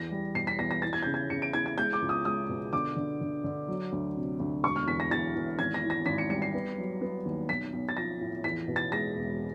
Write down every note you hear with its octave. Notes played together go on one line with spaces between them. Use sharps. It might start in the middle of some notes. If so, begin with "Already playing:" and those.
Already playing: E2 A#6
G3
B2 C7
B6
E2 A#6
A#6
E3 A6
G#6
C#3 G6
G#6
C#3 C#7
D7
E3 G#6
G#6
G#3 G6
D6
C#2
D#6
G#3 D#6
B2
D3 D6
D3
D3
D3
F#3
D2
C3
D2
E1 C#6
F6
E2 B6
A#6
E2 A6
E2
G#1 G#6
A#6
E3
A#6
G#1 B6
C#7
G3 C#7
C7
B3
F#3
B3
D#2
B1 B6
B1
A6
F3 A#6
A2
E2 B6
B2
A6
G#3 A#6
E1